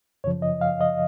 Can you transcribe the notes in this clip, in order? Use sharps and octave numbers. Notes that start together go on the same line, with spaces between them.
F#2 C#3 F3 C#5
D#5
F5
D#5